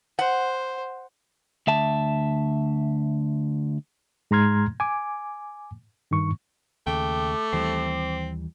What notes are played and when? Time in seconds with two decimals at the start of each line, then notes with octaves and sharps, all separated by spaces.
0.19 C5 F#5
1.67 D2 E5 A5
4.31 G#2 G#3 A#5 C6 F6 G#6
4.80 G#5 D6
6.11 G2 D#3 C#6
6.87 D#2 C#3 A3 G5 D6
7.53 D#2 E3 G3 C4